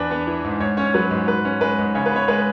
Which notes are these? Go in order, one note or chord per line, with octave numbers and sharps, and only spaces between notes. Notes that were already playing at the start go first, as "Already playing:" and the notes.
Already playing: E2 D4 B4
B3
E3
G#2
G#2 C#5
C#4 C#5
F#3 B4
G#2
G#2 B4
C#4
G#3 B4
G#2
C#3 C#5
B4
B3 C#5
G#3 B4